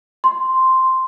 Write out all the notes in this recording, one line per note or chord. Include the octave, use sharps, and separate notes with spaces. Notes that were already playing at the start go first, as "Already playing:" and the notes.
C6